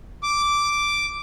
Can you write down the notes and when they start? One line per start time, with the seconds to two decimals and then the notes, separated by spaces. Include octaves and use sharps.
0.23 D6